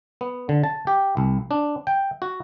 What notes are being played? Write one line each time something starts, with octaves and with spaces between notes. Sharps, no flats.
B3
D3
A5
G4
C2
D4
G5
F#4